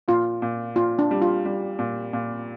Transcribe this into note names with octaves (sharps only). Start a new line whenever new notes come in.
A#2 F4
A#2
A#2 F4
D4
G3
F4
G3
A#2
A#2